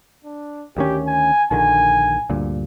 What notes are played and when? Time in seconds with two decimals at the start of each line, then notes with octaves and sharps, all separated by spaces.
0.25 D4
0.77 D2 D#3 C#4 G4
1.07 G#5
1.51 A#1 D3 D#3 G#5
2.30 D2 G2 A#2